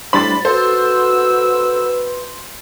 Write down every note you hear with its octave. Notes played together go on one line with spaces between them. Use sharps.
A2 G3 D4 C5 B5 A6
F#4 A4 B4 C5 E6